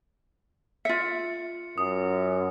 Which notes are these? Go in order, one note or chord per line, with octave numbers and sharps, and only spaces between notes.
F4 E5 C#7
F#2 D#6